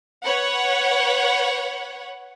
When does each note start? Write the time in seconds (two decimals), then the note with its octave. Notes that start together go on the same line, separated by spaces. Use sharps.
0.24 B4 C#5 F#5